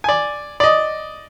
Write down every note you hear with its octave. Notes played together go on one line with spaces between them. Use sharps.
D5 G#5
D5 D#5